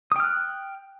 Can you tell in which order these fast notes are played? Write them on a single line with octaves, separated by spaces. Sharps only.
D#6 G5 F6 F#6